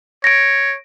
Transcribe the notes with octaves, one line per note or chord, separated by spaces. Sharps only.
C#5 A#6 D7